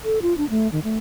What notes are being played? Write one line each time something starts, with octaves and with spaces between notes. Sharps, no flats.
A4
F4
D4
A3
D#3
A3